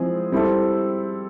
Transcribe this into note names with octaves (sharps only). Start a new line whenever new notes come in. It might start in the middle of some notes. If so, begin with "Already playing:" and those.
Already playing: F3 G#3 C4 E4 G#4
G3 C4 E4 A4